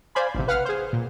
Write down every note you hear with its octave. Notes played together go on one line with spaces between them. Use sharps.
C5 D5 F5 G#5 B5
A1 C3
B4 F5 F#5 F6
G#4 C5
A#2